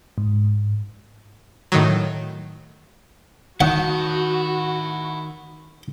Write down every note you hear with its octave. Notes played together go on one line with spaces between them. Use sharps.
G#2
A2 D#3 F#3
D#3 E4 F#4 F#5 A5